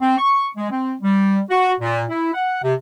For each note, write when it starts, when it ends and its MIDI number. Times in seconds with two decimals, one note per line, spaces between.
0.02 0.16 60
0.18 0.47 85
0.57 0.70 56
0.71 0.93 60
1.02 1.39 55
1.50 1.72 66
1.80 2.03 46
2.09 2.31 64
2.34 2.63 78
2.63 2.74 48